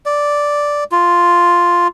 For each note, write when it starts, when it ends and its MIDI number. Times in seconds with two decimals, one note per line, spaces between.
0.06 0.84 74
0.92 1.87 65